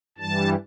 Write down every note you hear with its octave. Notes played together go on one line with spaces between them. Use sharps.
G2 E3 G3 A5